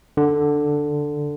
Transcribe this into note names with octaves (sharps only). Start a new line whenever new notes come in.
D3